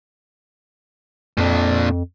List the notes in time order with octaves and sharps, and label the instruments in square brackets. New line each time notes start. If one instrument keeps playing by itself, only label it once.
[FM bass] F2 [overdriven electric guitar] A#2 D4